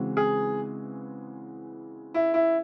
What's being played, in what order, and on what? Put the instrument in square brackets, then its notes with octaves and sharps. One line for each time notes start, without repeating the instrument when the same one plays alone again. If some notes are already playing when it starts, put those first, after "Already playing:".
Already playing: [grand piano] C#3 E3 G#3 C4 F#4
[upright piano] G#4
E4
E4